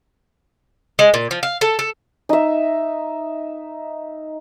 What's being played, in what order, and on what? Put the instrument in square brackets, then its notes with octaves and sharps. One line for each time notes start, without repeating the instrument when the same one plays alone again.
[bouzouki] G#3
A#2
F3
F5
A4
A4
[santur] D#4 E5